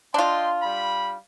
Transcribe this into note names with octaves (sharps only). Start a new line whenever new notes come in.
D4 F4 D#5 G5 C6
G3 B5